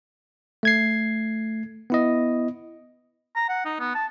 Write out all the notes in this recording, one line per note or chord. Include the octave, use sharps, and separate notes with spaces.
A3 G#6 C7
B3 E4 D#5
A#5
F#5
D#4
B3
A5